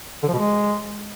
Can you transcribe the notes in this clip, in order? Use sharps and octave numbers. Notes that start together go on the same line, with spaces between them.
D3
F3
B2
G#3